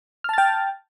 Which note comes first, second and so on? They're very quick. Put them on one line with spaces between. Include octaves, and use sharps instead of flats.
F6 A5 A6 G5